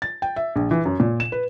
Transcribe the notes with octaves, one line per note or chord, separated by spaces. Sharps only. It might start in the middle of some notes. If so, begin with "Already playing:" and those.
A6
G5
E5
A#1
E3
F#2
A#2
E7
B4